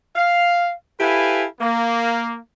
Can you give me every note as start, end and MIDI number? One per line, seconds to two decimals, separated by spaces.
0.15 0.73 77
1.00 1.45 64
1.00 1.45 67
1.00 1.45 69
1.00 1.45 71
1.00 1.45 77
1.00 1.45 80
1.61 2.38 58